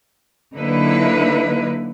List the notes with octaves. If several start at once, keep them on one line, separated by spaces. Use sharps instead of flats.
D3 F#3 A#3 D#4 E4 B4